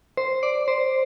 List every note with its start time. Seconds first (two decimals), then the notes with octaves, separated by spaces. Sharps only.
0.17 C5
0.43 D5
0.68 C5